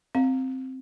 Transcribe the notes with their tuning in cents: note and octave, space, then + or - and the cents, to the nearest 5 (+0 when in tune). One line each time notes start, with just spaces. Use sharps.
C4 +0 F5 +25